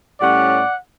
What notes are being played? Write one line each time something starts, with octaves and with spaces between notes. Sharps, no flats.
A2 G3 C#4 D5 F#5